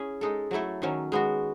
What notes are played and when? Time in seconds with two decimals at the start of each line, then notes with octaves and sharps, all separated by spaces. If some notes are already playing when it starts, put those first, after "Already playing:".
Already playing: C#4 E4 G#4
0.21 G#3 D#4 A4
0.51 F#3 A3 E4 A4
0.82 D#3 F#3 C#4
1.12 G#3 B3 F#4